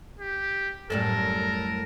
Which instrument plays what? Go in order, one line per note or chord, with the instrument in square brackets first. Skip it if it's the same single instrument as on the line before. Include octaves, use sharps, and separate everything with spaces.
[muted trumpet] G4
[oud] F#2 A2 G3 [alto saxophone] A4 [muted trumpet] A#4